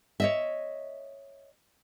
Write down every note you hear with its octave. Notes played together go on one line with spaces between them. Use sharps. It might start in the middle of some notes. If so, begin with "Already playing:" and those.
C#5 D#5 E5